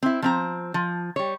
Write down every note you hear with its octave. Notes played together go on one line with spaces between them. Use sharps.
C4 E4
F3 C4 A#5
F3
G3 C#5